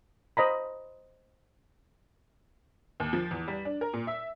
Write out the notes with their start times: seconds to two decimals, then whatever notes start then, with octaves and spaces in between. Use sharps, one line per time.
0.37 C5 D#5 A#5 B5
3.00 D#2
3.13 F3
3.31 E2
3.48 G3
3.65 D4
3.81 A#4
3.93 A#2
4.07 E5